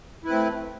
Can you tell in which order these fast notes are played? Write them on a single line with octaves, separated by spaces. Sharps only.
E4 B4 C4 A3